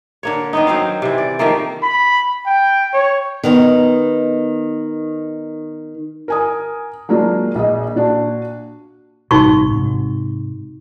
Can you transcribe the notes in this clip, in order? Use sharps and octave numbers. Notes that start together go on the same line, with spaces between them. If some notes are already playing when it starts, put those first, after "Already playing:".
D3 A#3 C#5
D#3 B3 D#4
F#3 C4 C5 F5
C3 E3
D5
D#3 F3 A3 A#3
B5
G5
C#5
D#3 B3 D#4
A#4 G#5 D#6
F#3 G#3 A#3 D4 F4
A#1 D#5
A#2 D4 F#4
A1 G2 C3 D#4 F#4 C#6
G#2 C3